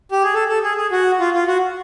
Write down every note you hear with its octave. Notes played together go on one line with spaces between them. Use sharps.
G4
G#4
A4
A4
G#4
G#4
F#4
F4
F4
F#4